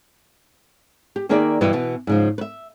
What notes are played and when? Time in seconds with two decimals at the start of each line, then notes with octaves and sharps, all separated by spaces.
1.16 G4
1.29 D#3 A#3 G#4 A#4 D5 E5
1.61 G2 B2 E3 E4 B4
1.73 B2 E3 B3
2.07 G#2 C#3 F3
2.38 B4 E5